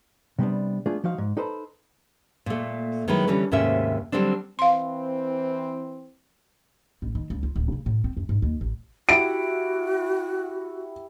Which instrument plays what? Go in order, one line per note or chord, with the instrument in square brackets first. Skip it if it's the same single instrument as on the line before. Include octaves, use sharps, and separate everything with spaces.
[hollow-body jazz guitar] C3 G3 B3 D4
A3 B3 D4 F4 G#4
F3 D#4 F#4 F5
G#2
D#4 A4 B4 C5 A5 B5
[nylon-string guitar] A#2 A3
D#3 F#3 G#3 E4 B4
D3 E3 G3 C#4
D#2 G#2 C3 A3 C#4 E5
D3 F#3 G3 C4 D4
[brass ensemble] E3 C4 [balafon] F5 C6
[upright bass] A1
D#3
C#2
F4
D1
C#3
A2
C4
F#2
G#2
D#2
A1
[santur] E4 G4 F#5 [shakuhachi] F#4 [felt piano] D7